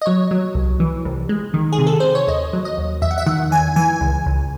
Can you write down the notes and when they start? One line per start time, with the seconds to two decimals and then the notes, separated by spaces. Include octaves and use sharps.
0.02 D#5
0.06 F#3 C#5
0.31 F#3
0.55 C2
0.80 E3
1.05 C2
1.29 G#3
1.54 D#3
1.73 G#4
1.79 C3
1.87 A4
2.00 C3 C5
2.15 C#5
2.28 D#2 D#5
2.53 F#3
2.65 D#5
2.78 D#2
3.02 E2 E5
3.11 F#5
3.18 E5
3.26 D#3 F#5
3.51 E2 G#5
3.76 E3 G#5
4.01 C#2
4.26 C#2